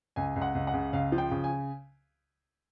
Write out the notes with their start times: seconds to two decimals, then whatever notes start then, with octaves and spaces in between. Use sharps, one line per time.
0.16 C#2 G#5
0.36 C#2
0.42 F#5
0.55 C#2
0.67 F#5
0.74 C#3
0.93 C#2 F5
1.12 F3
1.18 G5
1.31 C#3
1.44 G#5